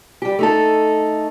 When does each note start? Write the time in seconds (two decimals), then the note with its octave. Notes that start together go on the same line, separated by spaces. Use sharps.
0.22 G3 G4
0.39 A3 D#4 A4